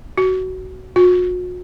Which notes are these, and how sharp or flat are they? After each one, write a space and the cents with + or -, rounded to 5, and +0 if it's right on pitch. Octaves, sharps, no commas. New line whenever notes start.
F#4 +15
F#4 -40